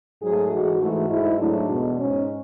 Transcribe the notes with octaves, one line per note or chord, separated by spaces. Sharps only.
G#2 F#3 A3 G#4
G#2 E3 G#3 F#4
G#2 E3 A3 F#4
G#2 G#3 E4
G#2 F#3 A3 D4
E2 B2 G#3
G#2 G#3 C#4